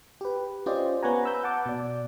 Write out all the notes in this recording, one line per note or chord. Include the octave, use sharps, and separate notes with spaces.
G4 B4
C#4 F4 G4 C5 D5 D#5
B3 B4 C#5 F#5 G#5 A#5
B5 E6 G6
F#5 A5 D6
B2 D5